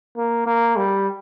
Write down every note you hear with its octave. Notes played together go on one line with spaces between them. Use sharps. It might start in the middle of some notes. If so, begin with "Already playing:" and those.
A#3
A#3
G3